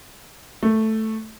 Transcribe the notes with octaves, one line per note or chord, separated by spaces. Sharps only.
A3